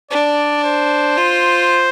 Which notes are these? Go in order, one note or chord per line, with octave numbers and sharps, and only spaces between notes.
D4 D5
C5
F4